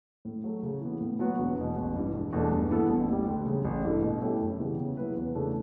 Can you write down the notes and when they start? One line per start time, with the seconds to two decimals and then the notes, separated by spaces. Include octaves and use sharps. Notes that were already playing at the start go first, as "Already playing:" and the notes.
0.25 A2
0.44 F#3 A3
0.63 C#3
0.81 E3 B3
1.00 A2
1.19 F#3 B3 F#4 B4
1.39 E1
1.57 E2 B2
1.76 A1
1.95 G2 E3
2.14 E1
2.33 E2 B2 A3 D4
2.52 G2
2.70 E3 B3 E4 A4
2.90 A1
3.08 A2 G3
3.28 D2
3.46 C#3 F#3
3.65 A1
3.84 G2 E3 A3 E4
4.02 B2
4.21 A3 C#4 E4 G4
4.40 F#2
4.59 C#3 E3 G3 B3
4.78 C#3
4.97 F#3 B3 E4 B4
5.16 E2
5.35 C#3 E3 A3 D4